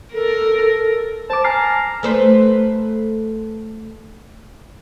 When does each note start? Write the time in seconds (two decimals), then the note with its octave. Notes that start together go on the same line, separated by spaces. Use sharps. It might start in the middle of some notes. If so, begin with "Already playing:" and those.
0.14 A4 A#4
1.30 C5 A5 D6
1.44 G#5 A#5 F6 C7
2.03 A3 B4 C5